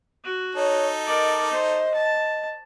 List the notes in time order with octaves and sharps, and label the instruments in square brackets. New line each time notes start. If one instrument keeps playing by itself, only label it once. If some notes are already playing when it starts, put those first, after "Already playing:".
[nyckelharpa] F#4
[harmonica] D#4 A4 [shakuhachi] C#5
[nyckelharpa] A#4 D5 [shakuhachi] D#5
[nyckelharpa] C5
A5